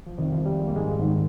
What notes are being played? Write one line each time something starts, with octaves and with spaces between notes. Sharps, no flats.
F3
F2 C3 D#3 G3
F3
G3
G#3
A#3
G#2 G#3
G#2 D#3